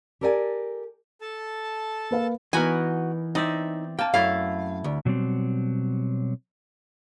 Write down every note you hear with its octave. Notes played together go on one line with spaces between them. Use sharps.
G4 A4 A#4 D5 E5 G#5
A4 A5
A#3 B4 F5
E3 B3 D#4 F#4 A#4 G#5
C4 D#4 D5 E5
A#3 G5 A5
F#2 A3 E4 A4 F5
D2
B2 F#3 G3 C4